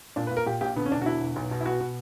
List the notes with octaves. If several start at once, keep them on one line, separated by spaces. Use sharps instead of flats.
A#2 D4
B4
A#2
A#4
A#2 G4
A#1 G4
D3 B3
C#4
E1 D4
F#4
D3 E4
E1
B1
B2
E4
B2 F#4
B2